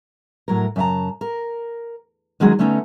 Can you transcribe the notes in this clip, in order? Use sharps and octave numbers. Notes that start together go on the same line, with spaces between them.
A2 F#3 A#4
F#2 C#3 E5 A5 A#5
A#4
D#3 F#3 G#3 C#4 F#4 G#4
D3 A3 B3 C#4 D#4